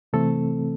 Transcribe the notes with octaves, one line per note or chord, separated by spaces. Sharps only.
C3 E3 A3 C4 A4